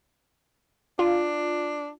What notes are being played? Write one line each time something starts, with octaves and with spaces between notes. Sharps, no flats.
D4 F4